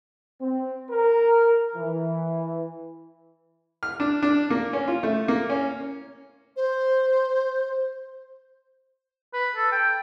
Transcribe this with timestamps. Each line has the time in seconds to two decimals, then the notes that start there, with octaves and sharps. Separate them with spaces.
0.41 C4
0.90 A#4
1.75 E3
3.83 F6
4.00 D4
4.22 D4
4.50 A#3
4.73 C#4
4.88 F4
5.03 A3
5.28 A#3
5.50 C#4
6.57 C5
9.33 B4
9.56 A4
9.72 G5